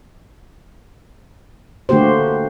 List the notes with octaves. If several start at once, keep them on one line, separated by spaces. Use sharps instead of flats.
D3 A3 A#3 F#4 G4 C5